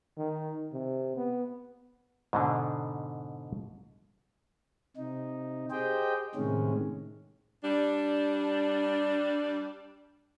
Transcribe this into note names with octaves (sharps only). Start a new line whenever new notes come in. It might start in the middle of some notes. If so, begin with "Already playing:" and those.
D#3
C3
B3
G#2 B2 D3
C3 D#4
G4 G#4 C5 D#5 G5
A2 C3 D#3 G#3 C#4
G3 D4